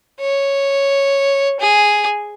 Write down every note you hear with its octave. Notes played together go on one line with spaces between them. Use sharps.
C#5
G#4